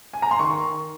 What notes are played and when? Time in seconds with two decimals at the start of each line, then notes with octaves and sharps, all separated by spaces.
0.13 G#5
0.22 A#5
0.31 C6
0.39 D#3 C#6